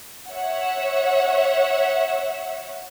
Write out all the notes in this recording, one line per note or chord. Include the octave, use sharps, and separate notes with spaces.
C#5 E5 F#5